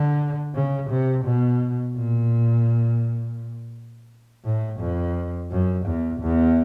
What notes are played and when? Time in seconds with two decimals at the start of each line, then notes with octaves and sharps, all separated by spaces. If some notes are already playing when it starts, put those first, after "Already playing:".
Already playing: D3
0.54 C#3
0.90 C3
1.25 B2
1.96 A#2
4.44 A2
4.79 F2
5.51 F#2
5.86 E2
6.21 E2